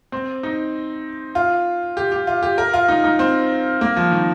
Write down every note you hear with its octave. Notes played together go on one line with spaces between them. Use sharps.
C4
D#4
F4
G4
G4
F4
G4
A#4
F4
D#4
D#4
C4
A#3
F3
D#3